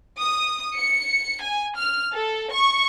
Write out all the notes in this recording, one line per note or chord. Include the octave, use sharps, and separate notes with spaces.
D#6
C#7
G#5
F6
A4
C#6